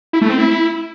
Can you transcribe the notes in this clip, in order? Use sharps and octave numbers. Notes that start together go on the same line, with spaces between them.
E4
A3
C4
E4